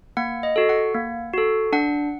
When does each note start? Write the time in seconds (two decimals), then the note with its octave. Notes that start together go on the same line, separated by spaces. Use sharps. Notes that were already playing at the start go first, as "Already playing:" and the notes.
0.17 A#3 F#5
0.43 D#5
0.56 F#4 A4
0.69 F#5
0.94 A#3
1.33 F#4 A4
1.73 D4 F#5